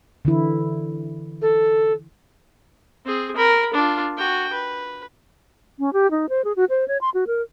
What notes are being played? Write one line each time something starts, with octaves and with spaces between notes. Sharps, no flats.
D3 E3 E4
A4
C4 G#4
A#4 B5
D4 F4
F#4 G5
B4
C#4
G4
D#4
C5
G#4
F#4
C5
C#5
C6
F#4
A#4